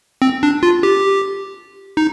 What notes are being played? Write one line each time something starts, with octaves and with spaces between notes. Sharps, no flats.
C4
D4
F4
G4
D#4